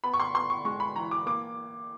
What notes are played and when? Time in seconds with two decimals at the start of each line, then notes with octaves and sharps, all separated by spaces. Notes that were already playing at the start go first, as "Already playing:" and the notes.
0.04 B3 B5
0.14 C#6
0.20 C6
0.34 B3 C6
0.50 C#6
0.65 G#3 C#6
0.80 B5
0.96 E3 A#5
1.11 D6
1.26 A#3 D6